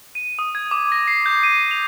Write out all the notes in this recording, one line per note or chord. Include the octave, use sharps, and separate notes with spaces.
D#7
D#6
G#6
D6
A#6
C7
G6
D#7
F7